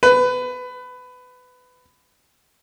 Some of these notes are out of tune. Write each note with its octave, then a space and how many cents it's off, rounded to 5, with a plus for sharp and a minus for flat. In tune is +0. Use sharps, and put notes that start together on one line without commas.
B4 +20